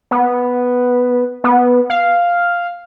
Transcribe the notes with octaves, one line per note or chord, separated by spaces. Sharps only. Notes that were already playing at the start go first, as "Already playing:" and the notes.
B3
B3
F5